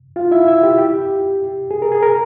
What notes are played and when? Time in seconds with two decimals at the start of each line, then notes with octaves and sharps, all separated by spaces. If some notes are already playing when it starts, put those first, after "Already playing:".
0.16 F4 F5
0.31 E4 E5
0.47 E4 E5
0.63 G4
0.78 G4
1.71 G#4
1.82 A#4
1.92 G#4
2.03 A#4